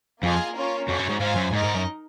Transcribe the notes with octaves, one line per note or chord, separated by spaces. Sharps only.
F2 A#3 F4 G#4 D#5 G#5
A#3 C#4 F4 A#4 C#5
F2 F#4 C#5 G#5
F#2
G#2
G#2 F4 C5 F5 G#5
F#2
G#2 D#4 A#4 D#5
G#2
F#2